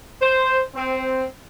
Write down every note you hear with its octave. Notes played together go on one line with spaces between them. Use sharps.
C5
C4